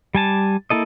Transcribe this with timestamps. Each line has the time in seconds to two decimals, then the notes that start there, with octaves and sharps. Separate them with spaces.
0.15 G3 G#5 A5
0.70 A#3 E4 A4 D#5